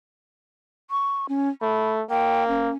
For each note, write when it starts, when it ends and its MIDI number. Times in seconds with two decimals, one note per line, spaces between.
0.90 1.26 85
1.29 1.49 61
1.62 2.03 57
1.62 1.91 83
2.10 2.70 58
2.10 2.44 79
2.48 2.77 61